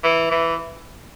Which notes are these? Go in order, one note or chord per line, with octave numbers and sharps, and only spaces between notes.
E3
E3